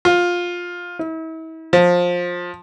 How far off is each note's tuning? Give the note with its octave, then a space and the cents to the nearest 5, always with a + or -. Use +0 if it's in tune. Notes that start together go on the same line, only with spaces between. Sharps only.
F4 +15
E4 -40
F3 +20